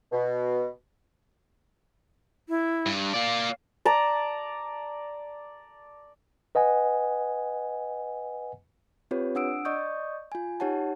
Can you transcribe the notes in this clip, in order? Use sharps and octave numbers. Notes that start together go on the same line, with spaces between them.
B2
E4
G2
A#3 D5 F5
D5 A5 A#5
B4 D#5 F#5 G#5
C4 F4 G4 B4 C#5
D4 F#5 D#6 E6 D7
D5 D#5 C#6 D#6 G6
F4 G#5
D#4 G4 C#5 F#5 A5